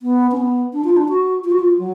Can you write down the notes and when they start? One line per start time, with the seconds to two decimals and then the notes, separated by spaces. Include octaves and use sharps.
0.02 B3
0.31 C#4
0.37 B3
0.73 D4
0.84 F4
0.96 D4
1.09 F#4
1.44 F4
1.52 F#4
1.59 F4
1.79 F#3